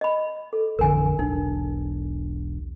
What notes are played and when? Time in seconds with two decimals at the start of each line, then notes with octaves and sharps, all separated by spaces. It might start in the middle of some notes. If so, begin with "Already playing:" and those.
0.01 D#5 B5
0.53 A4
0.79 A1 F2 D3 A#4 G#5
1.19 E1 B1 D4 D#4